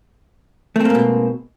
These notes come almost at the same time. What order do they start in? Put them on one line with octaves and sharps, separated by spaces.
A3 C4 A#3 G#2 B2